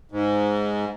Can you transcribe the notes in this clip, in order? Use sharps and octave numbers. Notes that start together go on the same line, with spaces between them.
G#2